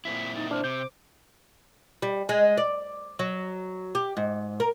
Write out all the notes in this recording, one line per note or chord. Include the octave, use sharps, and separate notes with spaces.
A#2 C4 E4 B6
D#4 A6
D4 C5 F6
C3 D6 G6
G3
G#3
D5
F#3
G4
G#2
A#4